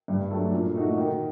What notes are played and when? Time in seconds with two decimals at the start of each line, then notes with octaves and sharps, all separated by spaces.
0.08 G2
0.31 F#3 A3 D4 A4
0.52 A#2
0.75 A3 D#4 F#4
0.97 D#3